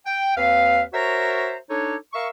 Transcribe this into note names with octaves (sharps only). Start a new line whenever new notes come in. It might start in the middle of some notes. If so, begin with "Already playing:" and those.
G5
D#2 C4 B4 F5
F#4 A#4 C5 C#5 E5 A#5
D4 D#4 A4 C#5
A#4 E5 F5 C#6